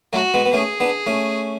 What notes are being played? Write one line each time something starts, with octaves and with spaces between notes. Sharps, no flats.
F#3 A3 F#4
G#3 B3
B3
A3 C#4 G#4
B3 D4
A3 C#4